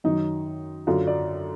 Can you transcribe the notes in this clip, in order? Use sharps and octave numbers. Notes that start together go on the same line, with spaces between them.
F#2 D#3 F#3 D#4
F#2 D3 F#3 F4
D5